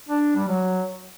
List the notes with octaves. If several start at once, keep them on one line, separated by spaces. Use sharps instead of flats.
D4
G3
F#3